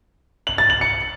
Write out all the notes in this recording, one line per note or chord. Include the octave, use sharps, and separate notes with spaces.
F#7
A6
F#7
C#7